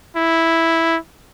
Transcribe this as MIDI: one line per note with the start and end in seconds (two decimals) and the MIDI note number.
0.16 0.97 64